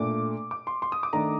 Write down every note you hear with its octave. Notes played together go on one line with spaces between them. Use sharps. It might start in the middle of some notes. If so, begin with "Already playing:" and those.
Already playing: A#2 A3 D4 D6
D6
C6
C6
D#6
D6
D#3 A3 D4 A#5